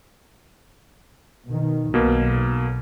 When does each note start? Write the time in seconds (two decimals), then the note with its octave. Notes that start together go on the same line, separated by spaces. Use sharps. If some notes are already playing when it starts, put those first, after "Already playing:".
1.47 B2 D#3
1.94 B1 B2 A#3